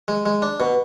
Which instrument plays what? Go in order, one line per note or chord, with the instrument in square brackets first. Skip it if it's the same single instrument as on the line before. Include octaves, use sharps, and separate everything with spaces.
[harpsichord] G#3
G#3
D4
B2